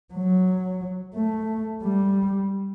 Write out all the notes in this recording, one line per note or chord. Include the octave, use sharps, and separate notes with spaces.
F#3
A3
G3